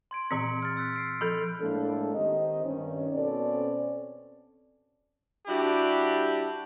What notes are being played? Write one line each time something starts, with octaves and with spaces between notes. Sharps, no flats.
C6 G#6 D7
A#2 E3 C4 C#7
F6 A6
E6 F#6 B6
C7 D7
F3 A4 B5
A2 G#3 A#3 D4 A4
D#3 C4 G4 D#5
G2 D#3 C#4
B2 C4 C#4 A4 D5
G3 D4 E4 F#4 G4